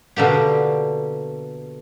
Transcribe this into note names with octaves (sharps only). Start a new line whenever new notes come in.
B2 D3 A#3 G4